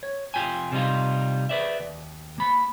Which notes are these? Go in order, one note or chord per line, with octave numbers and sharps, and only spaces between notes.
C#5
F2 D#3 F4 G5 G#5
C3 G3 D#4 F4
B4 D5 E5
D#2
A#3 B5